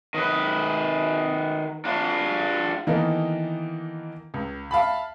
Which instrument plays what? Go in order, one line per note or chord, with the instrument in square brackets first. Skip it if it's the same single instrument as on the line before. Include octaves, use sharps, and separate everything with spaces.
[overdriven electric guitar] D#3 B4
D4 F4
[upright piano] D#3 E3 A#3 B3 D#4 A4
C#2
E5 F5 A5 B5